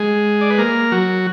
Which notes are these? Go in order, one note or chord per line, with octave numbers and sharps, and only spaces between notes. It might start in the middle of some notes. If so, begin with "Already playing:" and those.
Already playing: G#3 G#4
D5
B4
A#3 A#4
F#3 F#4